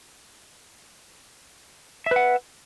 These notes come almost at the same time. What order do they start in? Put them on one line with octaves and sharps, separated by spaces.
E5 B4 F#5